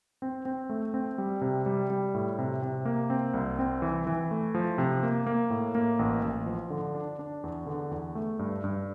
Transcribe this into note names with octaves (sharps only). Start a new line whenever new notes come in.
C4
C4
A3
C4
G3
C3
G3
G3
A2
C3
C3
A#3
C4
C2
C4
E3
E3
A3
F3
C3
A#3
A#3
A2
A#3
A1
A1
F3
D3
D4
D4
E2
D3
E2
A3
G2
G2